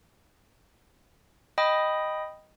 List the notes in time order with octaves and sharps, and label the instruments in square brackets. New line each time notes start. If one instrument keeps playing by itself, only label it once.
[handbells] D#5 G5 B5 D#6